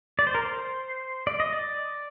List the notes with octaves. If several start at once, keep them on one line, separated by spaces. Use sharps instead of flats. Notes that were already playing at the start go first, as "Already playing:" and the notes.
D5
C5
A#4
C5
D5
D#5
D5